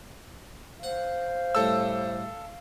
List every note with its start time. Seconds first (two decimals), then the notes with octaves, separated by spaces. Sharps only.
0.83 C5 F5 F#5
1.55 A2 G3 A4 E6